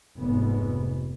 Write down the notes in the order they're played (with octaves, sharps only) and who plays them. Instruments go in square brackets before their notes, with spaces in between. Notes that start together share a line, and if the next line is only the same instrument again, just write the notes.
[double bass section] F1 G#2 B3